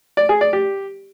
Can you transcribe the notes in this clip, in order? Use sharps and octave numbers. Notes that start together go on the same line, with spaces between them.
D5
G#4
D5
G4